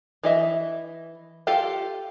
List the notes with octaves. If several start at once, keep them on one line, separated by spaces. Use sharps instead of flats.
E3 D#5 E5
F4 G4 A4 F5 G5